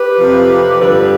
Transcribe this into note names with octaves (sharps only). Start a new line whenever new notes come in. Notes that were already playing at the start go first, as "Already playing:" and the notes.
Already playing: G4 B4
F2 C3 F3
G2 D3 F3 G4 B4